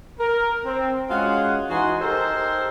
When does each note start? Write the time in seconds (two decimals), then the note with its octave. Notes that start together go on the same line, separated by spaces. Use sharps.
0.20 A#4
0.65 C4
1.10 G#3 C#4 F4 F#4 G#4 F#5
1.69 E3 D#4 F#4 G#5 C6
2.01 D#4 G4 A4 A#4 C5